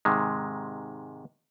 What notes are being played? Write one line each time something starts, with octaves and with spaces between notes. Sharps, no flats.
G#2 C3 D#3 G#3